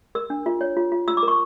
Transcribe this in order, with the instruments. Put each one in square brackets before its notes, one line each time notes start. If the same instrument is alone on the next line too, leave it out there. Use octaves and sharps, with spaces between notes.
[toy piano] A#4 E6
D4
F4
C#5
F4
F4
F4 E6
D6
A#4
C#6